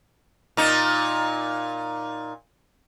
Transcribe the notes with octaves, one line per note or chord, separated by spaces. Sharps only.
A#2 D#4